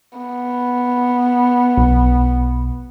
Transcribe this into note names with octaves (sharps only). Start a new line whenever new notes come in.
B3
B1